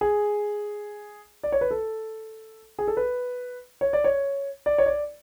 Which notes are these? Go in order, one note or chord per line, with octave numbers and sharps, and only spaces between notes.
G#4
D5
C#5
B4
A4
G#4
A4
B4
C#5
D5
C#5
D5
C#5
D5